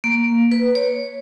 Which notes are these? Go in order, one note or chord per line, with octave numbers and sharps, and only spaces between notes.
A#3
B4
C#5